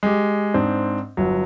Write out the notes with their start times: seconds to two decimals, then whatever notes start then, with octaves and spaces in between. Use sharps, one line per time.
0.03 G#3 G4
0.54 G#2 C4 D4
1.17 G1 F#3